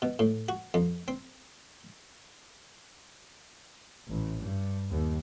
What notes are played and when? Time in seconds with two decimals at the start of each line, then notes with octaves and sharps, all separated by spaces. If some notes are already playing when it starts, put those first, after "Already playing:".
0.02 B2
0.19 A2
0.49 F#4
0.74 F2
1.08 C4
4.08 A1
4.40 G2
4.90 D#2